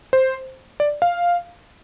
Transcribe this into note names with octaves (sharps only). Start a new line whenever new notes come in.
C5
D5
F5